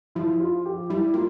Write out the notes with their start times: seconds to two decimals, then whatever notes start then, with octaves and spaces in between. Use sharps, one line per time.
0.15 F3 E4
0.40 F4
0.66 G4
0.90 G3 E4
1.14 A#3 F4